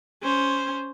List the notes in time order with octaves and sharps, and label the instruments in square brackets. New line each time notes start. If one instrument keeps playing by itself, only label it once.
[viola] C#4 C5